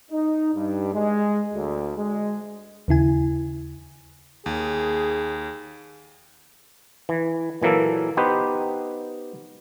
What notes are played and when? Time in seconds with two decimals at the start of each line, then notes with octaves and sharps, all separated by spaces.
0.11 D#4
0.54 G2
0.94 G#3
1.53 D2
1.97 G#3
2.88 D#2 C#3 E4 G#5
4.46 D#2 G#4
7.09 E3
7.62 A#2 E3 F#3 A#3 A4
8.17 B3 D#4 G4 B4 C5